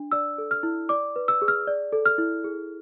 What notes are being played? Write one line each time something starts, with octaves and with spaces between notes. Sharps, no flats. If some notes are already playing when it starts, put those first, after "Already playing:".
Already playing: D4
D5 E6
A4
F6
E4
D5 D6
B4
E6
G#4
F6
D5
A4
F6
E4
G#4